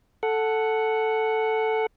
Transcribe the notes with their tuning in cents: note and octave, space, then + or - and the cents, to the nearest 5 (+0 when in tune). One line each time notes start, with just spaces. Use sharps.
A4 +0 F#5 +0